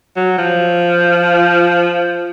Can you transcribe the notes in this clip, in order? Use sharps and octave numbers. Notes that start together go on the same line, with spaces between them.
F#3
F3